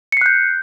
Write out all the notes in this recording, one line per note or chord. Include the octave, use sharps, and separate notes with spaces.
F#6 G6 C7 C#7